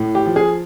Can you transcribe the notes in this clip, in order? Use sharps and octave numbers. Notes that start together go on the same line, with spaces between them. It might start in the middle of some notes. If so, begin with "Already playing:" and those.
Already playing: A2
G4
F3
G#4